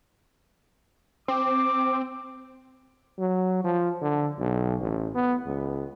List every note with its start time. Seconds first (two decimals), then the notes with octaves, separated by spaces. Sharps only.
1.28 C4 D6
3.19 F#3
3.65 F3
4.02 D3
4.39 B1
4.80 A1
5.15 B3
5.46 C#2